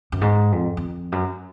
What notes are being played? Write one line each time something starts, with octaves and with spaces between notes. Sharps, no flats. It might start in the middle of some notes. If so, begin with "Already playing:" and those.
F#2
G#2
F2
F2
F#2